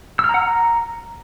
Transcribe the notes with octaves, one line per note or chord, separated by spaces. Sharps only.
E6
F6
A#5
F#5
A#5